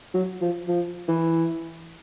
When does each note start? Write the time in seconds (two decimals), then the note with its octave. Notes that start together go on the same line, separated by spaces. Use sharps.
0.14 F#3
0.41 F3
0.68 F3
1.08 E3